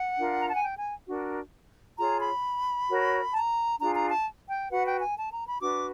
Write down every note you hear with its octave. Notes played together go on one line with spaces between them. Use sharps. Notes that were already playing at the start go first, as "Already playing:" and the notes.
Already playing: F#5
D4 F4 A#4
A#5
A5
G#5
G5
G#5
D4 F#4 A#4
F4 G#4 C#5 A#5
B5
F#4 A#4 C#5
A5
A#5
D4 F4 G#4 A#5
A#5
A5
G5
F#4 B4 F#5
G5
G#5
A5
A#5
B5
D4 F#4 B4 D6